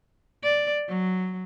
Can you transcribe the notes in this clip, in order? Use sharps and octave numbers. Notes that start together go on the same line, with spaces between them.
D5
F#3